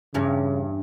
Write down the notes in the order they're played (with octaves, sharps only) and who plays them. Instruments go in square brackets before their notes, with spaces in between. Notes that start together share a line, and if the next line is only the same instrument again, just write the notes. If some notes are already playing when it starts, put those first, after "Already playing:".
[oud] E2 G2 C#4 [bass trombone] C#3